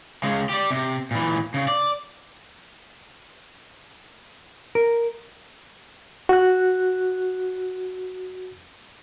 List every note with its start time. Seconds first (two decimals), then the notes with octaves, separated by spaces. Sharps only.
0.23 C#3 G#3
0.49 G4 D5
0.71 C3
1.11 A#2 E3
1.54 C#3
1.68 D5
4.75 A#4
6.29 F#4 F#6